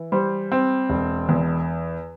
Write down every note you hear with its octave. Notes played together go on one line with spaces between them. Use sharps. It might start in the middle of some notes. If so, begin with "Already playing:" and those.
Already playing: E3
G3 C5
C4
E1
E2